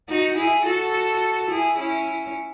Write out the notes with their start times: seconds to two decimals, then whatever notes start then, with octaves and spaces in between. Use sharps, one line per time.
0.09 D#4 F#4
0.36 E4 G#4
0.65 F#4 A4
1.50 E4 G#4
1.79 C#4 E4